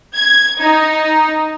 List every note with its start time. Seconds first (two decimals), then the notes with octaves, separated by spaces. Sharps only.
0.16 G#6
0.61 D#4